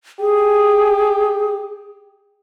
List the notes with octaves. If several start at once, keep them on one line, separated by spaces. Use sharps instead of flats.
G4 G#4